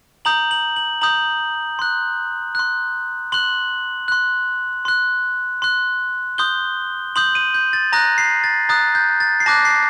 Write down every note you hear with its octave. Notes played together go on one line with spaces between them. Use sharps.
A#5 D#6 G6 F#7
F#7
F#7
A#5 D#6 G6 F#7
C6 F#6
C6 F#6
C6 F#6 F#7
C6 F#6
C6 F#6
C6 F#6
C6 D#6 G6 G7
C6 D#6 G6 F#7
D#7
G6
A6
A#5 D#6 F#6 A#6
C7
A6
A#5 D#6 F#6 A6
G6
A6
C7
A5 D6 F#6 A#6
C7